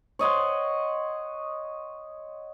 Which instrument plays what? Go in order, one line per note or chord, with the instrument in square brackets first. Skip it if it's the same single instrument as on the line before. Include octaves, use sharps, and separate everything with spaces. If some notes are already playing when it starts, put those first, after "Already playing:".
[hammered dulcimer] C#5 D#5 F#5 C6